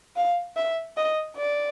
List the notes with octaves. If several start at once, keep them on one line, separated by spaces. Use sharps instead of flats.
F5
E5
D#5
D5